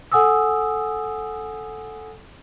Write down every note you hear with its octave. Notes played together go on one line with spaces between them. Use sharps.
A4 F#5 G#5 D#6 E6